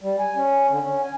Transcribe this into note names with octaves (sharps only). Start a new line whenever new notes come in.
G3
G#5
C#4
D3
C#4
G#5